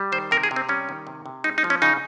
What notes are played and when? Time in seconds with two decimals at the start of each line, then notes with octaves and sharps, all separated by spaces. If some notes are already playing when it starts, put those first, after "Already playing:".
Already playing: G3
0.12 D#3 C5
0.31 C3 A#4
0.43 G#4
0.51 C3
0.56 C4
0.69 G3 C#4
0.89 D#3
1.07 C3
1.26 C3
1.44 G#3 D#4
1.58 D#4
1.64 F3
1.70 C#4
1.82 C#3 D#4